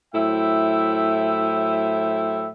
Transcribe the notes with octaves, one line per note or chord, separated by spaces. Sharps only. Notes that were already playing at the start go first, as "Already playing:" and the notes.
A2 F#3 E4 C5 E5 G5